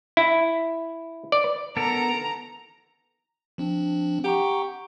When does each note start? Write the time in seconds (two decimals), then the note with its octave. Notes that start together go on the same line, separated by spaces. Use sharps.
0.17 E4
1.32 D5
1.77 B3 A4 A#4 A#5
3.58 F3 C4 D4
4.24 G4 F#5 A#5 C#6